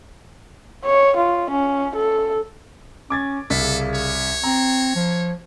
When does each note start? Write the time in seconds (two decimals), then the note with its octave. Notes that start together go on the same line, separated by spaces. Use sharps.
0.85 C#5
1.17 F4
1.50 C#4
1.95 A4
3.10 C#4 D6 G#6 A6
3.50 C2 C#3 A4 B6
3.94 C#5
4.44 C4 A#5
4.95 F3